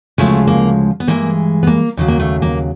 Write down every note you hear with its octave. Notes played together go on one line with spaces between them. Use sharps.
D2 C#3 F3 G#3 A3
A#3
B3
G2 E3 G#3 A#3
B3
A#3
D#2 C#3 F#3
A#3
A3
A#3